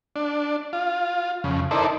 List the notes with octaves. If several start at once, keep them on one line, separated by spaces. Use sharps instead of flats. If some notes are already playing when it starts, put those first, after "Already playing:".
D4
F4
F2 C#3
D#4 E4 A4 A#4 C5 D5